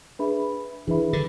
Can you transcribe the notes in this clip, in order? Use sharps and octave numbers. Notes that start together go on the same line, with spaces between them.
D4 G#4 B4 E5 B5
E3 D4 G#4 B4 E5 B5
D3